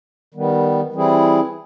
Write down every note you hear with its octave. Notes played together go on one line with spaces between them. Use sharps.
D#3 G3 B3
E3 G3 C4 E4 G#4